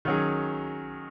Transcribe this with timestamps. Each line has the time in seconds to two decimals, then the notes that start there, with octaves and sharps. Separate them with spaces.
0.05 D#3 F#3 C#4 G#4